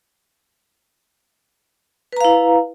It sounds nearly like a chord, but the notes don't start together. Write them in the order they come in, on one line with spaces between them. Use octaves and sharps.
B4 A#5 F5 E4